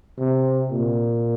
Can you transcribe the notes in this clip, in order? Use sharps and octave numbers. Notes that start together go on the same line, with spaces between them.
C3
A#2